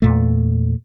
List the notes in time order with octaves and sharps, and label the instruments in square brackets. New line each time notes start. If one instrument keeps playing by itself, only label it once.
[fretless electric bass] E2 A#2 A3